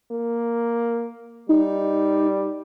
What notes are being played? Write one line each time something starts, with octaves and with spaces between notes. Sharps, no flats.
A#3
G3 D#4